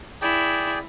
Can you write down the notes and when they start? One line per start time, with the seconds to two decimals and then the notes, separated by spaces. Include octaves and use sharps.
0.22 E4 G#4 D5 G5